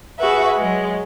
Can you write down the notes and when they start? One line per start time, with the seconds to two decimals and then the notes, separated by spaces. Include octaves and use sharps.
0.19 F#4 G#4 B4 E5
0.56 F#3 G#3